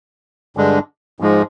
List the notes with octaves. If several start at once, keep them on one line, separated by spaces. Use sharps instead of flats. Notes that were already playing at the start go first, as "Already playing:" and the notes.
G2 D3 G#3 D4
G#2 F3 G#3